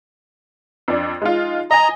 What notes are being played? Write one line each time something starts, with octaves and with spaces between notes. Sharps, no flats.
F2 D4
G#3 D#4 F4
D#5 G#5 A#5